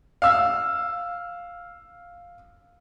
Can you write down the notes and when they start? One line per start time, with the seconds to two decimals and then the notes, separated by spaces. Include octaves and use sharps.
0.22 F5 E6